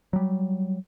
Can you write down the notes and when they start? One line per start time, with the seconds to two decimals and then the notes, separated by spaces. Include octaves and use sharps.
0.13 F#3 G3